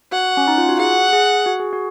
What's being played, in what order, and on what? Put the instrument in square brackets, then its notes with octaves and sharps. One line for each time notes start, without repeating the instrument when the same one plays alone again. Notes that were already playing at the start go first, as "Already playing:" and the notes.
[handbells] F#4 [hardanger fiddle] F#5
[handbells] C#4
D#4
F4
F#4
[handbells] G#4 [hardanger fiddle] F#5
[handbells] G#4
F#4
G#4
F#4